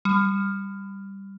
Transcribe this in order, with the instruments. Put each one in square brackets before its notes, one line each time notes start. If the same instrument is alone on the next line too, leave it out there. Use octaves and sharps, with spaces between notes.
[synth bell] G3